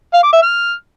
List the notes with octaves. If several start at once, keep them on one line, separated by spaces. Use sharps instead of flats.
F5
D6
E5
F6